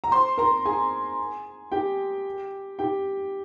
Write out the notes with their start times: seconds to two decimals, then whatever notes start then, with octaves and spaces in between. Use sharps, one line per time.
0.04 A#5
0.11 C5 C6
0.38 A#4 A#5
0.65 G#4 G#5
1.72 G4 G5
2.79 G4 G5